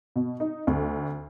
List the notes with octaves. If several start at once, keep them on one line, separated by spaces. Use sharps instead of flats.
B2
D#4
D2